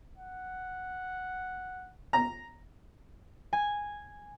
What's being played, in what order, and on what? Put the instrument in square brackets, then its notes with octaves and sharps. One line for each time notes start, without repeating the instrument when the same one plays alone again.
[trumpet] F#5
[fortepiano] A#5
[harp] G#5